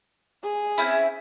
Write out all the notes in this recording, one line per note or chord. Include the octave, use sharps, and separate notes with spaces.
G#4
C4 C#4 E4